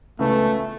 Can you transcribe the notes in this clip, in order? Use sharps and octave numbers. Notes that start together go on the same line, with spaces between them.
C#2 C#3 E3 A3 B3